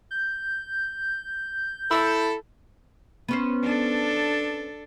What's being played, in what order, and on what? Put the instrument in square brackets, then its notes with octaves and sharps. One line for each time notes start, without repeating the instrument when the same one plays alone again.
[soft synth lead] G6
[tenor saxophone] E4 [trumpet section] A4
[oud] B3 C#4 C5
[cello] D4 A4